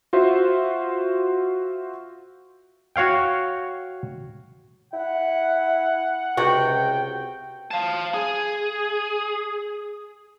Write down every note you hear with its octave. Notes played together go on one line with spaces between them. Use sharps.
F4 F#4 C5 E5
F#4 C#5 F5 G5
E4 F#5
C#2 C3 F#4 F#5 G5
F5 A5
G#4